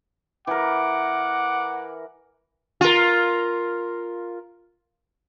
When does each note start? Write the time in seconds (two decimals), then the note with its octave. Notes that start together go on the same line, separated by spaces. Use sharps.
0.47 E3 A#4 F#5 D6
2.81 F4 A#4